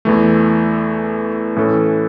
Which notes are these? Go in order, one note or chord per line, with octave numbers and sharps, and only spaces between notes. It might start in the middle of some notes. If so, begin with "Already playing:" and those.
E2 E3 A3
A2 E3 C#4 A4